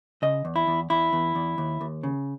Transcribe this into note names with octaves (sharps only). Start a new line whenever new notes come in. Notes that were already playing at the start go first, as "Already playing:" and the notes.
C#3 D#5
E2
E4
E2
E2 E4
E2
E2
D#2
D#2
C#3